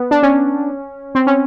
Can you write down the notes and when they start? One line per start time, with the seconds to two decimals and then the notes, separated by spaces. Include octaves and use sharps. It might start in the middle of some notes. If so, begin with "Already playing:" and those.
Already playing: B3
0.11 D4
0.23 C#4
1.15 C4
1.27 C#4